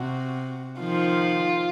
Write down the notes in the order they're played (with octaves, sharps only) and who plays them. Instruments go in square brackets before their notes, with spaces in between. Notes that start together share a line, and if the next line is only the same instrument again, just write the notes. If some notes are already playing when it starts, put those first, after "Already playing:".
Already playing: [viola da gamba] C3 [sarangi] F#4
[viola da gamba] D#3 F3 [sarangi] F4